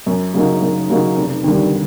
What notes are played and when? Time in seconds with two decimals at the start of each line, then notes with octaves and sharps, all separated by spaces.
0.06 F#2
0.34 C#3 F#3 A#3 D#4
0.62 F#2
0.89 C#3 F#3 A#3 D#4
1.17 F1
1.44 D#2 D3 G3